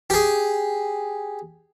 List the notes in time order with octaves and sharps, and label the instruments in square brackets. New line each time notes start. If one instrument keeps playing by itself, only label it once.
[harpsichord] G4 G#4